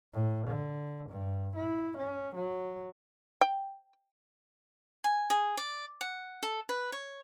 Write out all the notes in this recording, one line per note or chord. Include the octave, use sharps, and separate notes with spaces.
A2
D3
G2
E4
C#4
F#3
G5
G#5
G#4
D5
F#5
A4
B4
C#5